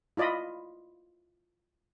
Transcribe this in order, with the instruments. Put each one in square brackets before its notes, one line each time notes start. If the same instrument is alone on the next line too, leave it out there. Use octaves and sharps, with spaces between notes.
[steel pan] E4 F4 D5 D#5 B5